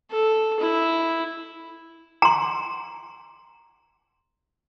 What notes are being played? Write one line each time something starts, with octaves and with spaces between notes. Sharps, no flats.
A4
E4
A#5 C6